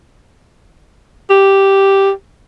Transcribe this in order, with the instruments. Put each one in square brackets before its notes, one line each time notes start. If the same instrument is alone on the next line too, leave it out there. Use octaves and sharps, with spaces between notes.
[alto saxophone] G4